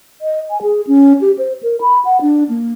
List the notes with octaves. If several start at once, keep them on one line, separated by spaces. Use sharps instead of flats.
D#5
G#5
G#4
C#4
G4
C5
A#4
B5
F#5
D4
A#3